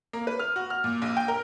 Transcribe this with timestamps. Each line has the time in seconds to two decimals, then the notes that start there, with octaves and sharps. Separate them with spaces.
0.13 A#3
0.27 B4
0.39 F6
0.56 F#4
0.70 F6
0.84 A#2
1.02 A#1
1.17 G5
1.28 A#4